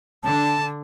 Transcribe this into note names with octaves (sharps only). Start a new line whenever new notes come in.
D3 D4 A5